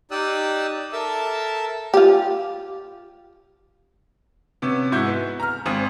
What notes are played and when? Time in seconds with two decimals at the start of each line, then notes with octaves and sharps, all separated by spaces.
0.11 D#4 G4 D5 D#6 E6 F#6
0.93 A4 A#4 E5 A5 E6
1.94 F4 G4
4.62 C3 B3 C#4
4.92 G#2 E4 F#4 G6
5.08 B3
5.40 A#5 F6
5.66 G#1 C4 G#5 D#6